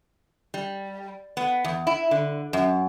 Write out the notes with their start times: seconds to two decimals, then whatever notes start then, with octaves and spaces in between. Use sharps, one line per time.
0.54 G3
1.37 B3
1.65 E2
1.87 E4
2.11 D3
2.53 F#2